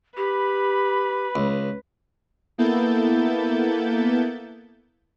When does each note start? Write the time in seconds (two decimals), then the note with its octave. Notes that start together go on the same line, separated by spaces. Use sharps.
0.17 G4 B4 B5
1.36 C#2
2.58 A#3 B3 E4 A4 G6 A6